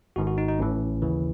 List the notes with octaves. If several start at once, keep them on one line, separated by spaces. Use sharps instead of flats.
G#1 G#2 D#3 F#4
F#4
D#4
D#4
A1 A2 E3 C#4
D#2 C#3 E3